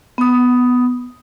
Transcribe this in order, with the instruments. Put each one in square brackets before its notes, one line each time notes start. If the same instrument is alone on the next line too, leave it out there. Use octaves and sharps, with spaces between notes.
[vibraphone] B3 D#6